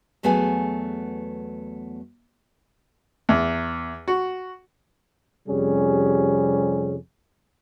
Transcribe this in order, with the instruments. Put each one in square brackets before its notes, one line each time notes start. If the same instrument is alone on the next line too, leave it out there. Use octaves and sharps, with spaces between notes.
[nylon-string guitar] E2 F#3 A3 B3 G#4 G#5
[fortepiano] E2
F#4
[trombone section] F2 C3 G3 C#4 G#4